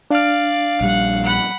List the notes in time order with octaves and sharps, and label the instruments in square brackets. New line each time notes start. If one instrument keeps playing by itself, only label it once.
[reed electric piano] D4 F6 [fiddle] D5 [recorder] F5
[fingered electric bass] A#1 G3 [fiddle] F#5
[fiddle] F#5 B5